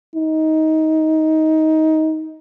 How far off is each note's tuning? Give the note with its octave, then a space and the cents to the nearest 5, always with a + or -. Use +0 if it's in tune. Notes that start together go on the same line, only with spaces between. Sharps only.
D#4 +20